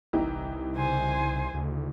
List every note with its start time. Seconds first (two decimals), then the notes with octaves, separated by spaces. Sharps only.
0.13 G1 C2 E3 D#4 G4
0.77 C#3 C5 G#5
1.54 D2 C#3